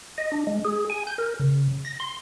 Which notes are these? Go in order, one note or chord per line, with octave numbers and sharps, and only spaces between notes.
D#5
D4
G#3
G#4
G#5
G6
A#4
C#3
A#6
C6